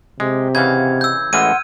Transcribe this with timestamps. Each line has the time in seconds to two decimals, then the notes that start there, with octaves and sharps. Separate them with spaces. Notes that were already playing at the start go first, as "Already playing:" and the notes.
0.20 C3 G#3 G4
0.55 C#3 E3 D#4 F5 F#5 G#6
1.01 E6 G6
1.33 A1 E3 G#3 F#5 C6 E6 F6 D#7